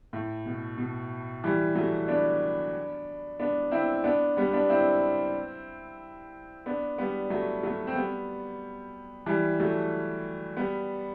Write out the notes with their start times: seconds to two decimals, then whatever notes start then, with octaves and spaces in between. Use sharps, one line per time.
0.13 A2
0.46 B2
0.78 B2
1.44 E3 G3
1.75 F#3 A3
2.08 B3 D4
3.39 B3 D4
3.71 C4 E4
4.04 B3 D4
4.37 G3 B3
4.53 B3 D4
4.70 C4 E4
6.66 B3 D4
6.98 G3 B3
7.30 F#3 A3
7.63 F#3 A3
7.87 C4
7.96 G3 B3
9.26 E3 G3
9.60 F#3 A3
10.57 G3 B3